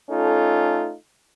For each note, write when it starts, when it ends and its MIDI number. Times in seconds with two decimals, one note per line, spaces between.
0.11 0.95 57
0.11 0.95 61
0.11 0.95 63
0.11 0.95 65
0.11 0.95 69